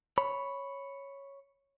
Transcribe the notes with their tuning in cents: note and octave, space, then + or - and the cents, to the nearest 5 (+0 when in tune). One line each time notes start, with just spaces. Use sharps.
C#5 +0 B5 +0